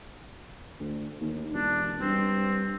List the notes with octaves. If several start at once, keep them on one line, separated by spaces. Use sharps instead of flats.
D2
D#2
E1 D4
G2 C4